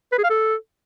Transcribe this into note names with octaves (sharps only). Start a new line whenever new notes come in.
B4
G#4
F5
A4